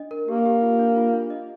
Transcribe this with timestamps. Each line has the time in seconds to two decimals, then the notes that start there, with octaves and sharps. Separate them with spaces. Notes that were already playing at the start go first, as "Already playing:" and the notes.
Already playing: D4 D#5
0.11 A#4
0.28 A#3 G4
0.45 G4
0.62 F4
0.79 D4
0.97 F4
1.13 D4
1.30 D#5